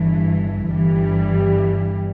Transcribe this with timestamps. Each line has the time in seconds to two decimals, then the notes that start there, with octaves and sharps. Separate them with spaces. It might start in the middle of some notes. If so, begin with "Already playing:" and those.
Already playing: G1 G2 E3
0.67 G1 G2 E3 G3